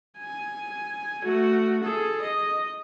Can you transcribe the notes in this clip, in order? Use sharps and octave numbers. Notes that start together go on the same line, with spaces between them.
G#5
A3 F#4
G#4 A4
D#5